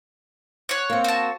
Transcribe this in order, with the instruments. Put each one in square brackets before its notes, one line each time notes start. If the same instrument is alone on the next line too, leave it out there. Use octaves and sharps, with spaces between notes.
[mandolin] C#5 F#5
[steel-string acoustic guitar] A#3 C4
[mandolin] F#4 A5